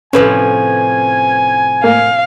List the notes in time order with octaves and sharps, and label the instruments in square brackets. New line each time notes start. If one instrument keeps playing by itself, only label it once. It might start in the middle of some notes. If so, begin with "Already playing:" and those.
[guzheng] A2 C3 F3 [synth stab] C#4 B4 [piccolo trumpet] G#5
[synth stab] A2 A#3 [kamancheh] F5